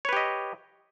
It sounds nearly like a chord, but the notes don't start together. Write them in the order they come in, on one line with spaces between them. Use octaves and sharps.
C#5 B4 G4 D#5